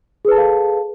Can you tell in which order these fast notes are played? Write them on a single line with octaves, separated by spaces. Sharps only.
G#4 B4 A5 A4 F5